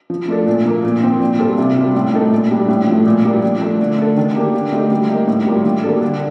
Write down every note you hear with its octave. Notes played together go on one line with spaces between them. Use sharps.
F3
A3 D4 A4
A#2
F3 A#3
A#2
F3 C4
A#2
G3 C4 F4 A4
C3
G3 D4 F4
A2
A3 D#4 A4
A#2
G3 D4
A2
F3 A3
A#2
G3 A#3 D4
F3
A3 D4
D3
A3 D4 A4
D#3
A#3 D4 G4
D3
A3 D#4 G4
G3
A#3 D#4
A2
G3 A#3 F4
D#3
G3 A#3 D4 A4
D3